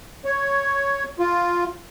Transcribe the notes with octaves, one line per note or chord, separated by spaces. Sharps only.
C#5
F4